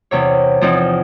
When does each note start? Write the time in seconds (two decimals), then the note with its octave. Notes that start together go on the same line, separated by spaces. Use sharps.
0.11 E2 C3 C#5
0.61 E2 F3 C4 D#4